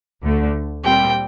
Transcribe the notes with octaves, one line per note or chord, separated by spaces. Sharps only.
D2 D3 A3
A#2 G3 C4 G5